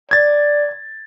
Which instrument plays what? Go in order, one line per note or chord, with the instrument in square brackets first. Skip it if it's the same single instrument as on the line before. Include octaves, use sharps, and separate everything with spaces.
[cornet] D5 [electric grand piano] G#6 A6